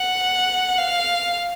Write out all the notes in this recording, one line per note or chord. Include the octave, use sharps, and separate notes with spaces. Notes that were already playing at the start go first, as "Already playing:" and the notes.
Already playing: F#5
F5